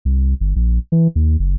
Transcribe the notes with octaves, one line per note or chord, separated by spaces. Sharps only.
C2
G1
A#1
E3
D#2
F#1